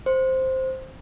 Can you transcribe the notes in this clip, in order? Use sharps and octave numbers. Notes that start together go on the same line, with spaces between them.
C5